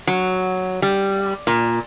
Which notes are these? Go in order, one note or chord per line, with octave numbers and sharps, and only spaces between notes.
F#3
G3
A#2